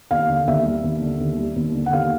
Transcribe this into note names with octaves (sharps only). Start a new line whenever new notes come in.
D#2 F5
D3
D#2 E5
G3
D#2
D3
D#2
G3
D#2
D3
F#5
D#2 F5